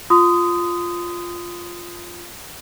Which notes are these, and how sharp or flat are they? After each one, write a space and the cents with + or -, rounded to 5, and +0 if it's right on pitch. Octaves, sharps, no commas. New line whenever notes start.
F4 +0 C6 -35 D#6 +0